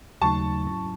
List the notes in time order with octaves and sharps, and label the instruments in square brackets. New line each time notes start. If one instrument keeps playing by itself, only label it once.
[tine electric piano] D#2 C#3 F#3 A3 D#4 [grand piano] A5 C#6
[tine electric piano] G#2 F#3 C#4 E4